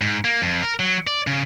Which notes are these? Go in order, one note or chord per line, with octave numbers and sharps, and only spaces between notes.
G#2
A#3
F2
A#4
F#3
D5
C#3